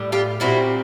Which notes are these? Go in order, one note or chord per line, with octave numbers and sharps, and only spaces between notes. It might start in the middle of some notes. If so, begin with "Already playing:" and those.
Already playing: A2 G3
F4 G4
A#2 G3 C4 E4 F#4